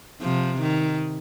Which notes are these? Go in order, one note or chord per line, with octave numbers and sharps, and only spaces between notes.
C3 F3
D#3